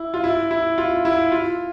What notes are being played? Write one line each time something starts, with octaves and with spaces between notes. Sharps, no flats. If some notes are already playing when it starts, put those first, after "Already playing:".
Already playing: E4
F4
E4
E4
F4
E4
F4